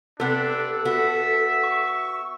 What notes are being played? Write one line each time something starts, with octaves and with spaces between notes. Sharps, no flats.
C3 B3 D4 A4
B3 F#4 E5
C#6